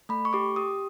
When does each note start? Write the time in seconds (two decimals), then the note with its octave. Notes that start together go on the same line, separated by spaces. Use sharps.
0.09 A3 B5
0.25 C#6
0.33 G4 D6
0.56 G4 D#6